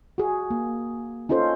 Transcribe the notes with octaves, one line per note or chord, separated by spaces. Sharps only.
F#4 G#4
A#3
C#4 D#4 F4 A4 C5